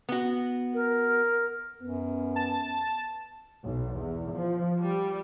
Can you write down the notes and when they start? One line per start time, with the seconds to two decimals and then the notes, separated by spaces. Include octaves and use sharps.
0.09 B3 F#4
0.74 A#4
1.82 F#2 B3
2.36 A5
3.63 B1
3.97 E2
4.33 F3
4.80 G3